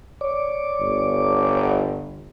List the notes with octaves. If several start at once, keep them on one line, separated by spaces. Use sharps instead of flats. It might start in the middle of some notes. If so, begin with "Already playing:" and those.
C#5 D5 D6
G1